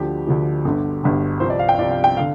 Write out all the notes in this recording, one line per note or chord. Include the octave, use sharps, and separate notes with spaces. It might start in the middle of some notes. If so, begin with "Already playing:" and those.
Already playing: D2 D3 F3 G4
D2 D3 F3
G1 G2 D3
G1 G2 D3
C2 C3 F3 C5
D5
F5
G5
F5
C2 C3 F3 D5
F5
G5
D3 F5